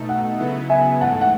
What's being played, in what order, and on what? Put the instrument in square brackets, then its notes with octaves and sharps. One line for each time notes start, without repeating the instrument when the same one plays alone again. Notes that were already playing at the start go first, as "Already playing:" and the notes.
Already playing: [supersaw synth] B2 A3 D#4 A4
[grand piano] F#5
[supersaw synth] C#3 F#3 B3 E4
[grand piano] E5 G#5
[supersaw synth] G#2 E3 A3 [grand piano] F#5 A5
[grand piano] F#5